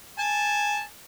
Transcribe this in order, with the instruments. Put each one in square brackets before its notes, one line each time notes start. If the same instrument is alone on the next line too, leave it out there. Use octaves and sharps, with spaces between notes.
[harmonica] G#5 A5